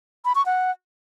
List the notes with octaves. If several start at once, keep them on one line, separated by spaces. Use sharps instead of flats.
B5
C#6
F#5